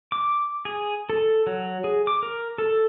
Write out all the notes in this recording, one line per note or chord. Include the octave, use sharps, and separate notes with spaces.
D6
G#4
A4
F#3
G#4
D6
A#4
A4